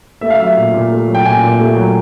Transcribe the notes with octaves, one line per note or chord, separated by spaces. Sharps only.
A3 E5
F5
F#3 E5
A#2
A#2
A3
F#3
G5
A#2 G#5
A#2
A3
F#3